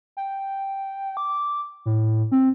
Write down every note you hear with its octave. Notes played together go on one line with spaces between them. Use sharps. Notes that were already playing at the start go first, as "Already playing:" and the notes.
G5
D6
A2
C4